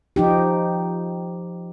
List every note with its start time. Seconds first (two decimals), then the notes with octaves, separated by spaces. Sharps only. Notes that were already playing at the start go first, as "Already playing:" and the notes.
0.16 F3 D#4 G4